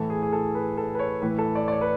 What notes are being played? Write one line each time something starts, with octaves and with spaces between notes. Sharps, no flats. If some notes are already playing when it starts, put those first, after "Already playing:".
Already playing: A2 E3 A4
G#4
G#4
A4
B4
A4
B4
C#5
A2 E3 B4
A4
D5
D5
C#5
B4